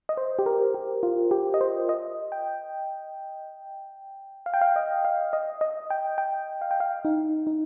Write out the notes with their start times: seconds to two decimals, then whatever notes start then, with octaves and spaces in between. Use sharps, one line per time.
0.09 D#5
0.17 C5
0.39 G4
0.46 A#4
0.74 G4
1.03 F4
1.31 G4
1.54 D#5
1.61 C5
1.89 D#5
2.32 G5
4.46 F5
4.54 G5
4.61 F5
4.76 D#5
5.05 F5
5.33 D#5
5.61 D#5
5.90 G5
6.18 G5
6.61 F5
6.71 G5
6.80 F5
7.05 D#4
7.47 D#4